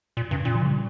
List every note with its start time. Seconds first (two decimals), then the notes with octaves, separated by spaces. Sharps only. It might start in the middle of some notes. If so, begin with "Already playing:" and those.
0.17 A#2
0.31 G2 C#3
0.45 A#2 C#3
0.55 F3
0.65 G3